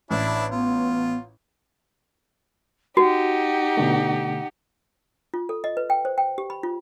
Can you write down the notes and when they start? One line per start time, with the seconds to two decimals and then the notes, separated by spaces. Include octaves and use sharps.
0.11 A1 D4 E4
0.51 B3 F4
2.97 D#4 F#4 G4 F#5
3.77 B2 D3 A3
5.34 F4
5.49 A4
5.64 D#5
5.77 B4
5.90 G5
6.05 C5
6.18 G5
6.38 G4
6.50 B5
6.63 F4